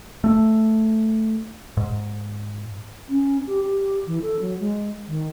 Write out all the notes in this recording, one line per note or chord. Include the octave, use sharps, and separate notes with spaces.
A3
G#2
C#4
G4
G4
E3
A4
F#3
G#3
D#3